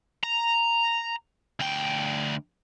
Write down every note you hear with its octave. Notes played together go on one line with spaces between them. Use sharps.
A#5
D2 G5